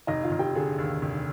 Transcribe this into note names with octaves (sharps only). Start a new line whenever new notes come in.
F1 D#4 D#5
F4 F5
F1
G4 G5
D3 G#4
D#2
F1